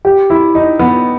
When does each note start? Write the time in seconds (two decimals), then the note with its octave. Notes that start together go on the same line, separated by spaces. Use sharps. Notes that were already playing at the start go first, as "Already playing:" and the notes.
0.05 G4
0.30 E4
0.55 D#4
0.79 B3